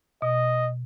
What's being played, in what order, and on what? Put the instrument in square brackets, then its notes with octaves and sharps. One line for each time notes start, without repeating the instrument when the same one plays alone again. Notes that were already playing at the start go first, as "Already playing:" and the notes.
[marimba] B2 [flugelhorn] D#5